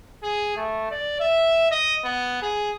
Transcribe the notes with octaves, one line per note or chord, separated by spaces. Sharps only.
G#4
A3
D5
E5
D#5
B3
G#4